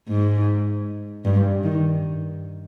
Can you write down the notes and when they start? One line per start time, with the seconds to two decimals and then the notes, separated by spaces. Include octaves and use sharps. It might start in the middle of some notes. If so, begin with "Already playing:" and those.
0.08 G#2
1.25 G2
1.63 D#3